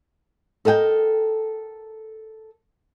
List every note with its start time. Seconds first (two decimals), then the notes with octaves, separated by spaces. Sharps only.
0.65 A4 A#4 D#5 F#5 G5